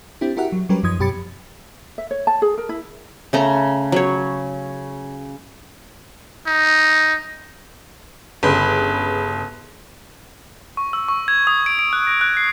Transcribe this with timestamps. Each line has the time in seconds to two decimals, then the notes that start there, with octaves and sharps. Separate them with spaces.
0.21 C4 D4 E4 G4
0.37 E4 F#4 G4 A#4 E5 F#5
0.52 F#3
0.69 F#3 G3 C#4 G4 A#4 B4
0.83 F#2 F3 D#4 D#6 G#6
0.99 F#2 B2 G4 B5 A6 C#7
1.98 E5
2.11 C#5
2.27 A5
2.42 G#4
2.58 A#4
2.69 E4
3.33 C#3 A3 A#5
3.92 F#3 C#5
6.47 D#4
8.43 G1 C#3 B4
10.77 C#6
10.93 E6
11.08 C#6
11.28 G#6
11.47 D#6
11.66 D7
11.79 D7
11.93 F#6
12.07 A#6
12.21 F#6
12.37 C7